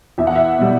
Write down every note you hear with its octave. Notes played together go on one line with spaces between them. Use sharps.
E2 E5
F#5
E5
B2 G3